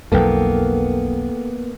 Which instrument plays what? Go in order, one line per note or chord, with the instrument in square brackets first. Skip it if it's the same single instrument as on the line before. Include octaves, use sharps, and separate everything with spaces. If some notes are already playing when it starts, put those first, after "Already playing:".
[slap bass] B1 F2 [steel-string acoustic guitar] A#3 B3 A#4 [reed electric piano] A4 G5